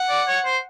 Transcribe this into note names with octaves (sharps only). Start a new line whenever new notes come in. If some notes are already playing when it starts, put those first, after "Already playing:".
Already playing: F#5
D5
C#5
C5